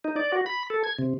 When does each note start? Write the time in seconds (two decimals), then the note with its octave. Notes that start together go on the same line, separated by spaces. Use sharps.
0.05 D#4
0.16 D5
0.32 F#4
0.46 B5
0.70 A4
0.84 G#6
0.98 C3